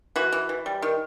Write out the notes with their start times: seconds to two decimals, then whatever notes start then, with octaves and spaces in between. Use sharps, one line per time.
0.16 E3 F#4
0.32 E3
0.49 E3
0.66 G3
0.82 D#3